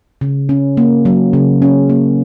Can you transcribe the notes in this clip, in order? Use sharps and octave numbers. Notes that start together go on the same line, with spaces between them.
C#3
C#4
A#3
F#3
C#3
C#4
A#3